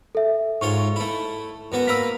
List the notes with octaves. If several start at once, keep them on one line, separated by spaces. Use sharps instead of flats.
A4 E5
G#2 F4 C#5 C#6
A3 E4
F#2 B3 F#4
A#3 A#4 B4 E6 B6